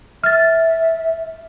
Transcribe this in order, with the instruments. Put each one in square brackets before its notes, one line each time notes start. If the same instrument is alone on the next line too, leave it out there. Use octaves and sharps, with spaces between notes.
[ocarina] E5 [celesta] F6 A6